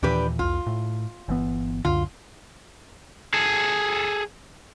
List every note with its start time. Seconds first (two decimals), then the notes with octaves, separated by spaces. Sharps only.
0.03 D#2 A#2 E3 D4 G4 B4
0.39 C2 F2 F4
0.67 A2
1.28 G1 E3 B3
1.85 C#2 F#2 D3 F4
3.34 G#4 A4